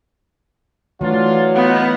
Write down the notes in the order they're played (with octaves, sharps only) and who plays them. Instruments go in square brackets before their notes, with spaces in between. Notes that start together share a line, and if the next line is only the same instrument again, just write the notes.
[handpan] E3 A3 [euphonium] F#3 [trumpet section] D4 F4
[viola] B3 [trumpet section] D#4 F5 F#5